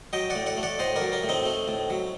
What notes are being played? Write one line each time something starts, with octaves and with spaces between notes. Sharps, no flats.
F#3 D#5 G5
D5 F#5
A2
D5 F#5
A3
D5 F#5
A2 C5 D#5
A#4 D5
F#3
G4 A#4
A2
C4 D#4
A3
A2
F#3